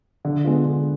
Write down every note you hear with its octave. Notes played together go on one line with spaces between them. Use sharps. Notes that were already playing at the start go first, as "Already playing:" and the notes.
D3
G#3 B3 F4
D3